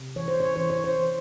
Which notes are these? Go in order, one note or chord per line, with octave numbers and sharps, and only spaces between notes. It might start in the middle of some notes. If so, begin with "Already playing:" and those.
Already playing: C3
E3 C#5
C5
C#5
E3 C5
C#5
C5
E3